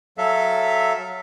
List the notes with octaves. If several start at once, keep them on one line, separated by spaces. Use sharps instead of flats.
F#3 A4 E5 F5